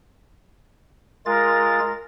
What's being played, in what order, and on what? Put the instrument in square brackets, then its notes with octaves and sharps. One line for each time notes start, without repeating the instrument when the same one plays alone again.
[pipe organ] G#3 F4 A6 [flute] A#4